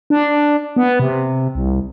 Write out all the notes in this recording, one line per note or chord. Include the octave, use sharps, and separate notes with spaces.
D4
B3
C3
C2